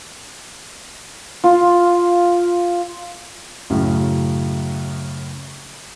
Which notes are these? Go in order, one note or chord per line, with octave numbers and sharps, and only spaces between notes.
F4
F#2 A2 C#3